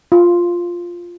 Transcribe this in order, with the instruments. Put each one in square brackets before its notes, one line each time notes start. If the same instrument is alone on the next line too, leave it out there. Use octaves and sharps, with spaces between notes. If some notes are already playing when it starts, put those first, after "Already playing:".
[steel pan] F4